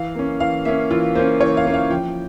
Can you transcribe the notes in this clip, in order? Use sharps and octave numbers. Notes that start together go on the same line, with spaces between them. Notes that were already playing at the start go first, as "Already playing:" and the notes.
Already playing: E3 F5
A#3 C#4
E3 F5
A#3 C#4 E5
E3 F4
A#3 C#4 C5
E3 C#5
F5
A#3 C#4
F5
F3 G5